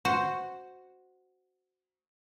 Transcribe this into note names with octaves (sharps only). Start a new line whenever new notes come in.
F#4 C5